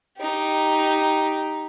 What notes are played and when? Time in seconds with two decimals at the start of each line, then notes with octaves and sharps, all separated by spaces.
0.18 D#4 G4